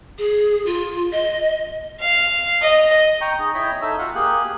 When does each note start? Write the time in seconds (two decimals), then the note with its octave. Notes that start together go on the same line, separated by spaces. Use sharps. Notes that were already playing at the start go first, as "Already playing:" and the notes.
0.18 G#4
0.66 F4
1.12 D#5
2.00 F5
2.62 D#5
3.21 G5 A#5 C#6
3.39 D#4 G#4
3.54 E4 C#5 D#5 G5 B5
3.82 D#4 A4 E5
3.99 F4 F#4 F5 F#5
4.15 A#3 G4 G#4 F#6